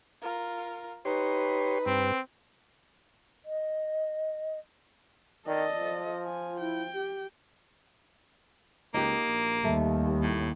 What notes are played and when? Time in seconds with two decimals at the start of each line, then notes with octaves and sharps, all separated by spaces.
0.22 F4 A#4
1.05 D#4 G4 B4 C#5 C6
1.86 G2 C4
3.45 D#5
5.47 D#3 A4 D5 D#5
5.78 F3
6.26 F4 G#5
6.60 E4 G5
6.94 G4
8.94 C#2 A#3 D#4 G4
9.28 A#1
9.64 D#2 G3 A3
10.22 A2